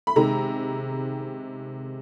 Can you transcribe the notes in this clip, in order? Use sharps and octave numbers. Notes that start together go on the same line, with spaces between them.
B5
C3 D#3 G#3 A#5